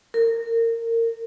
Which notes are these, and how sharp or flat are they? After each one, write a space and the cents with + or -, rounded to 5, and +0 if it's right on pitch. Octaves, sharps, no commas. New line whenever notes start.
A#4 -25